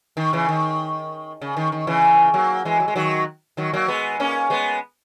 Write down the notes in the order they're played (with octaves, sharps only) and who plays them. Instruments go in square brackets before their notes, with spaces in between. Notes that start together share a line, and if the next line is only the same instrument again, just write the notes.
[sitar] D#3
C#3 E3
D#3
C#3
D#3
D#3
C#3 E3
F#3 A#3
E3 G#3
F#3
G#3
D#3 F#3
D#3 F#3
F#3 A#3
G#3 B3
A#3 C#4
G#3 B3